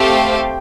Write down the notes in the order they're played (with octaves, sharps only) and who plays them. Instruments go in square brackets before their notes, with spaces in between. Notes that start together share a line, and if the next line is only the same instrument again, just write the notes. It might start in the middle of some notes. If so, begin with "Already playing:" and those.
Already playing: [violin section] A3 C4 G4 C5 F5 [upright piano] G5